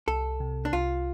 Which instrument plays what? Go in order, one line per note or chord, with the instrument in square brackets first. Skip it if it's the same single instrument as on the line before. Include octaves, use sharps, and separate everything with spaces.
[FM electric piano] C2 [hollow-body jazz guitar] A4
[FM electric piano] C3
[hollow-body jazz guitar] D4
[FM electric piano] C2 [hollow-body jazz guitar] F4